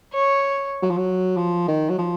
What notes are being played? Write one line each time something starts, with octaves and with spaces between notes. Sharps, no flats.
C#5
F#3
F3
F#3
F3
D#3
F#3
F3